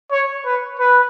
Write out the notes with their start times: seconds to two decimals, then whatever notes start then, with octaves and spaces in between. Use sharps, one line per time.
0.12 C#5
0.45 B4
0.80 B4